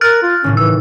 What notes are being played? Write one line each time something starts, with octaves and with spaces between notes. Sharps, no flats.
A#4 F6 F#6 A6
F4
G#1 A2 C#3 C#4
E3 E6